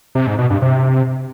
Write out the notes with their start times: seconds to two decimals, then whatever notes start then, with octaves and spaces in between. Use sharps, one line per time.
0.15 C3
0.27 G#2
0.39 B2
0.50 G2
0.62 C3